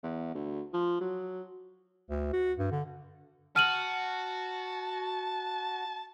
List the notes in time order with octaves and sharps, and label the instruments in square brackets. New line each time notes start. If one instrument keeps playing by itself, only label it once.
[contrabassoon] E2
D2
F3
F#3
[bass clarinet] D2
F#4
G2
D3
[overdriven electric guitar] F#4 [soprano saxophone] A5 [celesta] F6 D#7 F#7